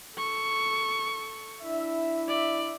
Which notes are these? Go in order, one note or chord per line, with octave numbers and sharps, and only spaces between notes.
A4 C#6
D4 E4 E5
D5